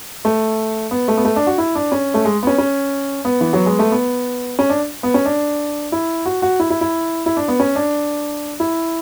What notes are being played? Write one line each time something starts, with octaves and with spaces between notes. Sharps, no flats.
A3
B3
A3
B3
A3
D4
F#4
E4
D4
C#4
A3
G#3
B3
C#4
C#4
B3
E3
F#3
G#3
A3
B3
C#4
D4
B3
C#4
D4
E4
F#4
F#4
E4
E4
E4
E4
D4
B3
C#4
D4
E4